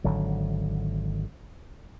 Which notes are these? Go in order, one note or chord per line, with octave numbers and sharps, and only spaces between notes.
G#1 D3 F#3